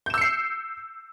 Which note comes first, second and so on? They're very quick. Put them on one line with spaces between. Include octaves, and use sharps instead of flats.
G6 E7 E6 C#7 C7